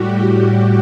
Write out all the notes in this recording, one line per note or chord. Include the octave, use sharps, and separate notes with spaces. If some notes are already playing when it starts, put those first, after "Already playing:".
Already playing: A2 G3 F#4 G4
F#4